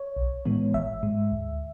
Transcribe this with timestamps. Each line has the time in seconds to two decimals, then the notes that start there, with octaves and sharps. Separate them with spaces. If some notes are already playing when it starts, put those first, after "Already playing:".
Already playing: C#5
0.17 B1
0.45 A2 E3 G#3 B3
0.74 G#1 E5
1.03 G#2 G#3
1.31 D2